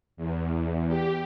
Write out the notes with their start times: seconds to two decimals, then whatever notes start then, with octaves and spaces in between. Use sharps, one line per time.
0.17 E2
0.88 G4